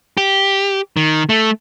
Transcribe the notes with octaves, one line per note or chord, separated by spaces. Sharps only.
G4
D#3
A3